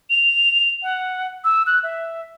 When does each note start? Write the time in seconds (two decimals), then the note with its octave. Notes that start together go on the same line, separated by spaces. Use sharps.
0.10 F7
0.83 F#5
1.44 E6
1.67 F#6
1.83 E5